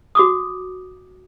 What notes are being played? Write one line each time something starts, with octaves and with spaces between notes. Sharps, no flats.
F#4 D6 D#6